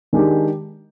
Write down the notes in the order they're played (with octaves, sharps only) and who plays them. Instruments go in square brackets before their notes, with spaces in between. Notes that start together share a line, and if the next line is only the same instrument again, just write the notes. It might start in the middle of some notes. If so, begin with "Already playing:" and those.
[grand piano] D#3 G#3 D4 G4